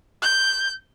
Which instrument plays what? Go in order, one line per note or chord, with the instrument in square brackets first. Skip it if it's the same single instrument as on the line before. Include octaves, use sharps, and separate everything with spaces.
[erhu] G6